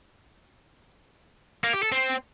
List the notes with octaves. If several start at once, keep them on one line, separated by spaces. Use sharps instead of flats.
A#3
G4
A4
C4